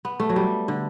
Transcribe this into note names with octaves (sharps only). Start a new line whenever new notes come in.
B3
A3
F#3
G3
D3